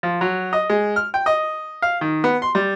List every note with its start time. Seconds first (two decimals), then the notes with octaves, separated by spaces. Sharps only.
0.03 F3
0.21 F#3
0.53 D#5
0.70 G#3
0.96 F6
1.14 G5
1.26 D#5
1.82 F5
2.01 D#3
2.24 B3
2.42 C6
2.55 G3